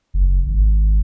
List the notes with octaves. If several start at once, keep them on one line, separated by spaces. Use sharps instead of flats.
F#1
G#1